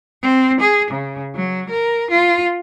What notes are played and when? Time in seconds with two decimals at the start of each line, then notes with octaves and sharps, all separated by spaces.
0.23 C4
0.60 G#4
0.91 C#3
1.36 F#3
1.70 A#4
2.11 F4